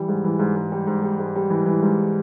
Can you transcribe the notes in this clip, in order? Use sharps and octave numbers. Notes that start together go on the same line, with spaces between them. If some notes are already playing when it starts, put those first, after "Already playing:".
Already playing: E3 G3
G#2
E3
G#2
G#2
G3
G#2
G3
G#2
G3
E3
E3
G#2